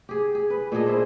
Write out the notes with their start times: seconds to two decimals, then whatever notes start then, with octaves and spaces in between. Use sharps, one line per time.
0.09 G4 G#4
0.35 G#4
0.50 B4
0.72 A#2 D4 G#4 D#5
0.86 E4 F4 G#4 C5